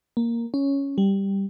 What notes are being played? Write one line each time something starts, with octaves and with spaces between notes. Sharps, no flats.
A#3
C#4
G3